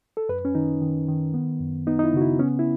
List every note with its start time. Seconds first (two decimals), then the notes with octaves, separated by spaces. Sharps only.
0.17 A4
0.29 F#2 B4
0.45 C#4
0.55 D#3 D#4
0.81 D#3
1.08 D#3
1.34 B3
1.60 F#2
1.87 B3 D#4
1.99 D#4
2.04 E4
2.13 C#3 F#4
2.22 E4
2.39 B3 C#4
2.59 E4